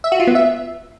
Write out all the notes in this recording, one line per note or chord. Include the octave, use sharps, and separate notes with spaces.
E5
F#4
F4
B3
E5